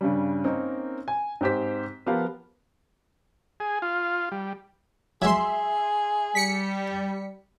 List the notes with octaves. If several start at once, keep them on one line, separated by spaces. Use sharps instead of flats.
G2 C#3 G3
A#3 C4 C#4 D#4 A#4
G#5
G#2 C4 G4 C5 B6
F3 B3 F4 G4 A#4 F5
G#4
F4
G3
F#3 G#3 G#4 E5 C6
G3 B6 C#7